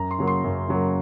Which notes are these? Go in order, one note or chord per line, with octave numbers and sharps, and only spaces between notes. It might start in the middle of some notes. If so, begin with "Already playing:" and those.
Already playing: F#2 A#5
C6
C#3 F#3 A#3
C6
F#2
C#3 F#3 A#3